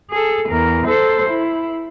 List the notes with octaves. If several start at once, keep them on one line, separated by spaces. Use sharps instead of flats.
G#4 A4
E2 A#4
A4 C5
E4